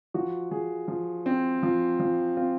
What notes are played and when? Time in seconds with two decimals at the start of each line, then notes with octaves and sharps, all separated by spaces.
0.14 F3 F#4
0.51 F3 G#4
0.88 F3
1.26 C4
1.63 F3
2.00 F3
2.37 C4 F4